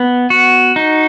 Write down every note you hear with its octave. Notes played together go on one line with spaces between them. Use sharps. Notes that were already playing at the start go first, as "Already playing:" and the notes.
Already playing: B3
F#4
D#4